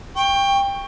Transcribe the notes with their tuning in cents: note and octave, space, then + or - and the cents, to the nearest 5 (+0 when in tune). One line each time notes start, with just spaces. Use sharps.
G5 +20 C#6 +0